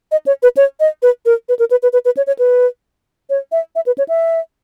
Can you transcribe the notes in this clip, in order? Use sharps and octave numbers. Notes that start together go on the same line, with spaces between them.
D#5
C#5
B4
C#5
D#5
B4
A#4
B4
A#4
B4
B4
B4
B4
C#5
C#5
B4
C#5
E5
E5
B4
C#5
E5